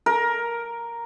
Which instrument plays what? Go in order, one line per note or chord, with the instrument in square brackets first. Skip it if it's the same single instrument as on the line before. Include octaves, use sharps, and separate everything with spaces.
[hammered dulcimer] A#4